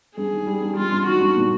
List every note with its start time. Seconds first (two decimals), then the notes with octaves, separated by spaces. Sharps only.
0.17 G2 G#4
0.32 D#3
0.46 G3
0.61 G2
0.77 G2 F4
0.92 G2
1.06 D#3 F#4
1.21 G2
1.37 A#2